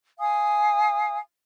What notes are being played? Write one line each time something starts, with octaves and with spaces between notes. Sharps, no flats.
F5 G#5 D#6